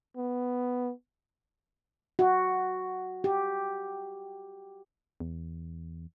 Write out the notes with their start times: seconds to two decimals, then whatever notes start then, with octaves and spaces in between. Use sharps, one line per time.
0.17 B3
2.19 F#4
3.24 G4
5.20 E2